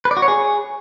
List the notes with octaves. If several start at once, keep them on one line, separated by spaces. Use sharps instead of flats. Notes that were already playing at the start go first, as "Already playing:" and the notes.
B4
D5
F#4
C#5
G#4